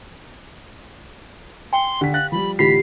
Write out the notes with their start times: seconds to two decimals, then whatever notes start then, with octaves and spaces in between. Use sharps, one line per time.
1.73 G5 G#5 C6
2.01 D3 G4 B6
2.14 F5 F#6 A6
2.32 F3 G3 B5
2.59 A2 D3 E3 F4 G4 B5 B6 C7